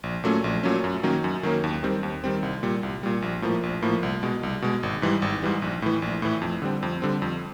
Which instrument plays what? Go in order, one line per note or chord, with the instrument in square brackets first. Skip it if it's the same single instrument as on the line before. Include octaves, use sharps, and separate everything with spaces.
[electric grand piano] A#1
A#2 F#3 A3 C#4
A#1
A#2 F#3 A3 C#4
F#2
D#3 F#3 A#3 C#4
F#2
D#3 F#3 A#3 C#4
D#2
D#3 G3 C4
D#2
D#3 G3 C4
C2
A#2 G3
C2
A#2 G3
A#1
A2 F3 A#3
A#1
A2 F3 A#3
C2
B2 G#3
C2
B2 G#3
G#1
G#2 E3 G3
G#1
G#2 E3 G3
A#1
A2 E3
A#1
A2 E3
F2
D3 G3 C4
F2
D3 G3 C4
F2